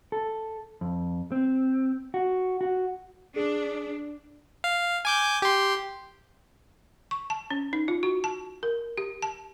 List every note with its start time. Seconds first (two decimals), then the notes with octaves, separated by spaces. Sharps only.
0.12 A4
0.81 F2
1.32 C4
2.14 F#4
2.61 F#4
3.36 D4 G#4
4.64 F5
5.05 G#5 D6 G6
5.42 G4 C6
7.11 C#6
7.30 A5
7.50 C#4
7.73 D#4
7.88 F4
8.03 F#4
8.24 A5
8.63 A#4
8.98 G4
9.22 A5